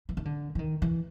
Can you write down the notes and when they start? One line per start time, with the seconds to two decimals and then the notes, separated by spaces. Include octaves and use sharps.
0.09 E3
0.17 D#3
0.25 D3
0.55 E3
0.59 D#3
0.82 E3